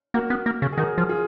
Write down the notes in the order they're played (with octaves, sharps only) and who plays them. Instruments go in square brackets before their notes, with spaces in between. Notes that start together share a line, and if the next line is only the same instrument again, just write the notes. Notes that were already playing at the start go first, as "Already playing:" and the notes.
[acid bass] A#3 [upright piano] F#4 A#4
[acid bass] B3
A#3
C#3
[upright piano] G#4
[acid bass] D#3 [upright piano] F#4 A#4
[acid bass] F3
[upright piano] F4 G#4